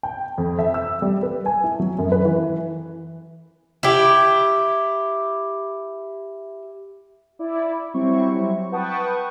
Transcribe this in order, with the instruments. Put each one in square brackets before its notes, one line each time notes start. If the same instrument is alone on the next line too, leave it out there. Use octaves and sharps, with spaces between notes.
[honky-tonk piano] G5
F2
E5
E6
G3
B4
G#5
E4
F#3
F#2
B4
E3
[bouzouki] E4 G4
[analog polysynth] E4 D5
F#3 G3 C4 E4 C#6
B4 F#5 G5 A5 C#6 D#6